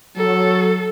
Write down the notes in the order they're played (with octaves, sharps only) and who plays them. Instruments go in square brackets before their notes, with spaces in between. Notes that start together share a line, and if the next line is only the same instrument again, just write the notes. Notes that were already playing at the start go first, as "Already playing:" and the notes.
[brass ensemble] F#3 [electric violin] A4